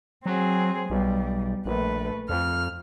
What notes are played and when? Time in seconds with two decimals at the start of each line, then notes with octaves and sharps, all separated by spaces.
0.26 F#3 C4 G#4
0.90 B1 G3
1.66 A#1 A3 B4
2.29 F2 F6